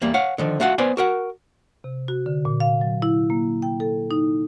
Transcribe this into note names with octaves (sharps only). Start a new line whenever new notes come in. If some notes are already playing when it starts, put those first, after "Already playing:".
E2 G3 A#3
C#5 F5 F#5
D3 D#3 F3
A3 F4 F#4 F5 F#5
B3 B4 C5 D5 G#5
F#4 A#4 F#5
C3
F#4
D3
A#2
F5
F#3
E4
A#3
G5
A4
D#4